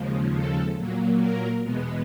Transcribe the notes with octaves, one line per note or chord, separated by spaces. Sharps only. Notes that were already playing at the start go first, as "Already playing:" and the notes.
Already playing: D#2 C#3 F3 G#3
A4
A#2 F#3 A#3
A#4
E2 B2 G#3 B3